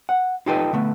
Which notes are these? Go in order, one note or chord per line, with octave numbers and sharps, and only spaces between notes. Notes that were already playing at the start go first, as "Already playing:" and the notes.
F#5
D#4 F4 G4 A4 B4 D#5
D3 A3 B3